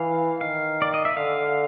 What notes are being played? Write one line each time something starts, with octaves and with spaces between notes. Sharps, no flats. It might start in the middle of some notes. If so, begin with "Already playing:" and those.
Already playing: E3 F5
D#3 F5
D5
D#5
E5
D3 F5